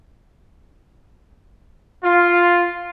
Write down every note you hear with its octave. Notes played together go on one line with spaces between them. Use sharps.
F4